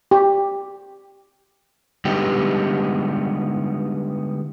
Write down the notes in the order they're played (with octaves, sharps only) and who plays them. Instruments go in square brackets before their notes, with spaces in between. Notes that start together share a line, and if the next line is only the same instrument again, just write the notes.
[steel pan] G4
[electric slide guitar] D3 G3 G#3 B3 D#4 G4